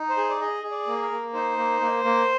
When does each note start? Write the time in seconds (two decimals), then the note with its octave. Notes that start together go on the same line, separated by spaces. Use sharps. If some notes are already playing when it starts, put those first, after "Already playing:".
Already playing: D#4
0.09 C5
0.17 G#4
0.30 D5
0.41 G#4 D#5
0.63 G#4
0.71 D5
0.87 A#3
1.02 A#4
1.11 A#3
1.33 D#4 C5
1.57 A#3
1.81 A#3
2.04 A#3